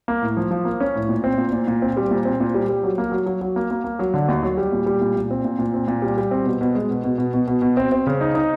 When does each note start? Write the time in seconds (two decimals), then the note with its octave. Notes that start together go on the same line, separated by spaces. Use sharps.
0.08 A#3
0.22 A2
0.37 F3
0.51 F3
0.65 A#3
0.80 C#4
0.95 A2
1.09 A#2
1.24 C4
1.37 A#2
1.52 A#2
1.67 A#2
1.82 C4
1.97 G3
2.11 A#2
2.25 C4
2.40 A#2
2.54 G3
2.69 G3
2.84 F#3
2.98 A#3
3.12 F#3
3.26 F#3
3.41 F#3
3.56 A#3
3.71 A#3
3.84 A#3
3.99 F#3
4.14 D3
4.28 D#2
4.43 F#3
4.57 G3
4.72 A#2
4.86 G3
5.01 A#2
5.16 A#2
5.31 C4
5.45 A#2
5.59 A#2
5.74 C4
5.88 A#2
6.02 G3
6.17 G3
6.31 C4
6.46 B2
6.61 B2
6.75 G#3
6.90 B2
7.04 B2
7.18 B2
7.34 B2
7.48 B2
7.62 B2
7.77 C4
7.92 C4
8.07 C#3
8.21 D#4
8.35 D#4